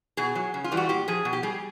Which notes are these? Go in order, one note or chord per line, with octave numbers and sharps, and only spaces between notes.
B2 G#4
F#3
C#3
F4
E3 G3
F#4
A#2 G4
F3 G#4
B2
G4
G3 G#4